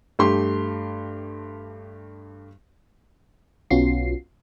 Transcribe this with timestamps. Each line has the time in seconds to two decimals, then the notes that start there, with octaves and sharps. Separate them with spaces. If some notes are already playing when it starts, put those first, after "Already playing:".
0.19 G2 A3 G4 C6
3.70 B1 B3 C#4 F4 F#4 C7